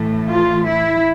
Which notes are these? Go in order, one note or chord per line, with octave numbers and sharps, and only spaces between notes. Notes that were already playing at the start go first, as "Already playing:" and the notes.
Already playing: A2 E3 A3
F4
E4